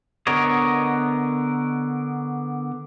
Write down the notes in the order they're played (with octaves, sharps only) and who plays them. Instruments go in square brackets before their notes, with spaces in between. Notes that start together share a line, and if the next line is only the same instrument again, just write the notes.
[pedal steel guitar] D3 B3 A#4 C#5 D#5